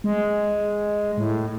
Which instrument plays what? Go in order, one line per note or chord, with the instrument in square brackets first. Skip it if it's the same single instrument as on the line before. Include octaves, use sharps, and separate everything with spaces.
[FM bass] G#3
A2